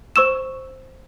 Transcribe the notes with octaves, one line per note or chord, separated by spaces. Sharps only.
C5 C#6 E6 E7